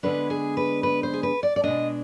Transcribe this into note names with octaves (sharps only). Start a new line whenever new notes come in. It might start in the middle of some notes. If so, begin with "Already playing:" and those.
D3 G#3 B3 D4 B4
G#4
B4
B4
C5
G#4
B4
D5
D5
B2 G#3 D4 D#5